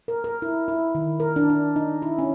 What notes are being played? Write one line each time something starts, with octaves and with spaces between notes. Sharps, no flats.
A#4
A#4
E4
E4
D#3
A#4
D4
D4
D#4
E4
C#4